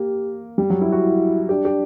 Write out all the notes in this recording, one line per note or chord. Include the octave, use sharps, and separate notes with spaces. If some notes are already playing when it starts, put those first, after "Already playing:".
Already playing: A#3 G4
G3
F#3
E4
F#4
E4
D4 G4
G4